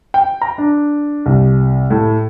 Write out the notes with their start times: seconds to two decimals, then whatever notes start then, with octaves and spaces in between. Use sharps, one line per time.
0.14 G5
0.42 A#5
0.58 D4
1.26 C2
1.90 A2